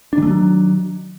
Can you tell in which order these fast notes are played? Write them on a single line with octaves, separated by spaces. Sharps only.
D4 D#3 A3 F#3